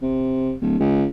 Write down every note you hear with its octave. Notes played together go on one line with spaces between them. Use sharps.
C3
D1
C#2